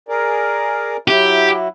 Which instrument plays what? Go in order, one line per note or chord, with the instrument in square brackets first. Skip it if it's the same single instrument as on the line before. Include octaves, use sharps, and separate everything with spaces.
[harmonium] G#4 A#4 D5
[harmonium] F#3 E4 [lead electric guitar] G4